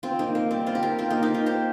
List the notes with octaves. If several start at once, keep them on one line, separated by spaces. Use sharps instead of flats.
C4 F4
A#3 D#4
A#3
G3 C4
C4 F4
G4
F4 A#4
C4 F4
A#3 D#4
D#4 G4
F4 A#4
G4 C5